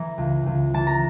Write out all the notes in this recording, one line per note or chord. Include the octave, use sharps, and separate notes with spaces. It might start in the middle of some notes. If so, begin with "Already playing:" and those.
Already playing: E3 A#5
C#2
C#2
E3 A5
A#5